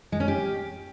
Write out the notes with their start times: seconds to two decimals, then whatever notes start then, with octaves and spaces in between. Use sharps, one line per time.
0.12 G#3
0.20 C#4
0.28 G4